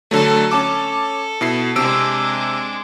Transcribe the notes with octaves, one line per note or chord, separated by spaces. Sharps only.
D3 F#3 A3 A4
C#4 A4 A5 D6
B2 E4 C7
C3 G#3 D4 E6 D7